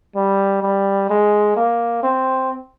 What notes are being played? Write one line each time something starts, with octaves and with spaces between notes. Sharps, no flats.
G3
G3
G#3
A#3
C4